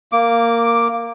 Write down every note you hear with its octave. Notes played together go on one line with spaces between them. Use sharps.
A#3 D6